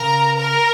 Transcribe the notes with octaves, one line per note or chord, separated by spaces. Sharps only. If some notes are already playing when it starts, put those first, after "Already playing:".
Already playing: C#3 A#4 A#5
A#4 A#5